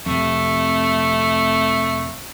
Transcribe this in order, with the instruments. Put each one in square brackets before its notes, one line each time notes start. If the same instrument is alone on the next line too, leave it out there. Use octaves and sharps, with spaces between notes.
[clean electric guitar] F2 C3 [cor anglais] A3